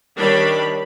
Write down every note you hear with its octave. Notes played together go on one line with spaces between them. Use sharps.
D#3 G3 D4 C#5 B5